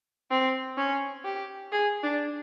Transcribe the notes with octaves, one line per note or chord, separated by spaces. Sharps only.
C4
C#4
G4
G#4
D4